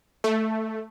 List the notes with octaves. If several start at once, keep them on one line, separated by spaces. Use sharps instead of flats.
A3